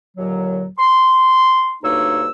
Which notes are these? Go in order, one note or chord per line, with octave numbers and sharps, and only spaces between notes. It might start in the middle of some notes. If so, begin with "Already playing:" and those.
D#2 A#2 D3 F#3
C6
D2 G2 A#3 D#4 C#5 E6